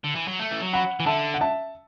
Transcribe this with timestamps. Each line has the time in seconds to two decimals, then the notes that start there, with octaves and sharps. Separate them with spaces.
0.04 D3
0.15 E3
0.28 F#3
0.39 A3
0.51 E3
0.62 F#3
0.73 F#5 B5
1.00 E3
1.06 D3 E5 A5
1.34 F#5
1.41 E5 A5